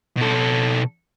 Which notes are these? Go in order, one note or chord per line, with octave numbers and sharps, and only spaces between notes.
B2 A4